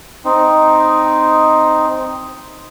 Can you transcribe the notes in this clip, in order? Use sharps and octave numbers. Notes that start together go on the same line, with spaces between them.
C4 D#4